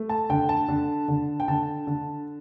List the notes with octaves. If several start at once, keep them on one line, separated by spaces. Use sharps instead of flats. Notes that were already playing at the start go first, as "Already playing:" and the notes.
Already playing: A3
A5
D3 G5
A5
D3
D3
G5
D3 A5
D3